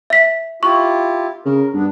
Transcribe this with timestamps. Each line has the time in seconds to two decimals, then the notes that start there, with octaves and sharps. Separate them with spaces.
0.10 E5 B6
0.63 E4 F4 G4 C#6
1.45 C#3 A#4
1.74 G2 B3 D4